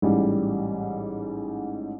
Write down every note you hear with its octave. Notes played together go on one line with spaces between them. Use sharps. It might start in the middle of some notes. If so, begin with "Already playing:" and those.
A1 G#2 G3